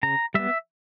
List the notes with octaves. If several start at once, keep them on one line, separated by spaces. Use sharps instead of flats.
C#3 A#5
G3 B3 E5